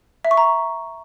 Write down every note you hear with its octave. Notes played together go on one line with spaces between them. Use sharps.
E5
C#6
A#5